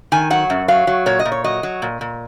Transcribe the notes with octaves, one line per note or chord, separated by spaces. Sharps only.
D#3 G#5
F#3 F#5
F#2
F#3 F5
F#3
A#2 C#5
D#5
A#2
C#5
F#3 D#5
F#3
A#2
A#2